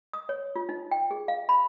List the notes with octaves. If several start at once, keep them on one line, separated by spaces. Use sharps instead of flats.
D#6
C#5
F4
D#4
G5
G#4
F5
B5